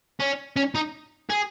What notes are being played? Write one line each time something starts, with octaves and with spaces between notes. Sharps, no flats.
C#4
C#4
D#4
G#4